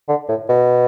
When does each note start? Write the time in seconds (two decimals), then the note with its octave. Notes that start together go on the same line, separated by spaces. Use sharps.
0.09 D3
0.29 A2
0.49 B2